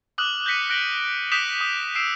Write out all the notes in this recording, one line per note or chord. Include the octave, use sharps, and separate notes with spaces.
D6 D#6 F6 F#6 F#7
G6 A#6 B6 C#7 D#7
F#6 A#6 D7 F#7 G7
D6 D#6 G6 B6 E7 F7
D#6
E6 C7 D7 E7